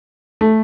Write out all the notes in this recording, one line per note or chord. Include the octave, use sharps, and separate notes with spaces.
A3